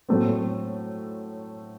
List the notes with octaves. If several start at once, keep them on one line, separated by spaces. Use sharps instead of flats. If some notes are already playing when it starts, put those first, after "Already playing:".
A2 F#3 A3 C4